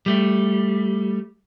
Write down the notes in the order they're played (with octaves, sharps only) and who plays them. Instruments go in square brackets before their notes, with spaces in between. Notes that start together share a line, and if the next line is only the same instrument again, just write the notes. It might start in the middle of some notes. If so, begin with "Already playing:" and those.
[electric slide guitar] G3 A3